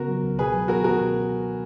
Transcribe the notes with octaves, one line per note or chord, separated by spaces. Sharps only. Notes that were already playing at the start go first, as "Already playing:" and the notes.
Already playing: C#3 B3 F#4 A#4
F#3
C#2
B2 G#4 B4
F#3
B3 F#4 A#4
B2 F#4 A#4